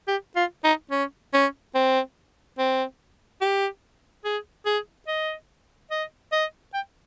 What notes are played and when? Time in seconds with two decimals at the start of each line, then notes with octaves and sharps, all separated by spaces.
0.08 G4
0.36 F4
0.64 D#4
0.91 C#4
1.34 C#4
1.75 C4
2.58 C4
3.41 G4
4.25 G#4
4.66 G#4
5.08 D#5
5.91 D#5
6.32 D#5
6.74 G5